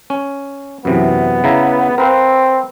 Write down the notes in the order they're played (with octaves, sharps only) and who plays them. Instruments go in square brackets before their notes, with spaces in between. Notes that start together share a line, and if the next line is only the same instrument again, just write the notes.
[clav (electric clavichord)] C#4
[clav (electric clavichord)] F#2 C3 E3 [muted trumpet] B3
[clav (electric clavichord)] C#3 E4 A#5
[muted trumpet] C4 [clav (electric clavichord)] A#4 B4 F5